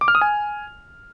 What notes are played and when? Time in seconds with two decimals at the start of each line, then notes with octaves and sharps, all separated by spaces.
0.01 D6
0.08 F6
0.15 D#6
0.21 G#5